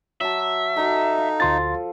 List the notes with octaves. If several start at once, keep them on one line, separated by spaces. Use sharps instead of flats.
F#3 E5 A5
F#3 D#4 A4
F5
D2 F3 C6 A6